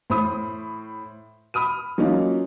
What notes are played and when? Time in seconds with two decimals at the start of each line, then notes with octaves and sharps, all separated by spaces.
0.10 A2 C5 B5 D#6
1.54 B5 D#6 F6 D#7
1.98 F#3 A#3 C#4 D#4 F4